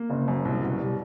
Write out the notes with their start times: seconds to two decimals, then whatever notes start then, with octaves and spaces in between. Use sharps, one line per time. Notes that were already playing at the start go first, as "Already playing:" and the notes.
Already playing: A#3
0.10 F#1
0.28 F#2
0.45 C2
0.62 B2
0.79 G3